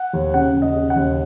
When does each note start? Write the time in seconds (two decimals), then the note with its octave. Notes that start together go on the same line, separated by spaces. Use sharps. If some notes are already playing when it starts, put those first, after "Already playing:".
Already playing: F#5
0.13 D#2
0.34 C#3 F#5
0.55 D#2
0.62 D#5
0.76 C#3
0.90 F#5
0.96 D#2